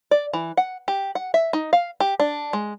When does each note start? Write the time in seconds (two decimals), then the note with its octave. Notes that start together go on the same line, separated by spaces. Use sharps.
0.11 D5
0.33 E3
0.57 F#5
0.88 G4
1.15 F#5
1.34 E5
1.53 D#4
1.73 F5
2.00 G4
2.20 D4
2.53 G#3